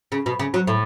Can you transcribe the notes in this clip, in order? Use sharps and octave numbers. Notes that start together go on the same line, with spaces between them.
C#3
B2
C#3
F#3
A2